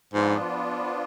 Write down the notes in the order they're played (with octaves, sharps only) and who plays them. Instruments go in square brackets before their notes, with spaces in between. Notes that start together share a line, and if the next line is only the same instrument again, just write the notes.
[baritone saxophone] G#2 [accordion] F3 B3 D4 F4